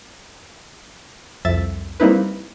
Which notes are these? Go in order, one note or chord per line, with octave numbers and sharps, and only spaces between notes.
C2 F2 E5 A6
G3 A#3 C4 D#4 E4 B4